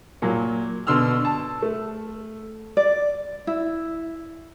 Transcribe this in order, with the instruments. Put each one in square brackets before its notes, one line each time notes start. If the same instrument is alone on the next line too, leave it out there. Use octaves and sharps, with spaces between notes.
[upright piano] A#2 F#3
B2 D3 C6 E6 F6
A5
A3
[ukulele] D5
E4